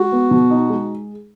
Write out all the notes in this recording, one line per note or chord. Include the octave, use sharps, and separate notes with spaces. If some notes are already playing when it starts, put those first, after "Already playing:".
Already playing: G#3 F#4
B3
B2
D#4
G#3